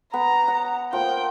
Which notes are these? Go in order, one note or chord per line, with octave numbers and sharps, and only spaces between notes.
B3 A#5
F#5
F3 A#3 G5